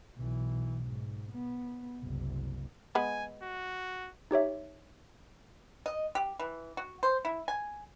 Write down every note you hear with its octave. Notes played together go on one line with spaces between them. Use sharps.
B1 E3
G#2
B3
F#1 C2
G#3 B3 G#5
F#4
D#4 G4 C#5 E5
D#5
G4
E3
F#4
C5
E4
G#5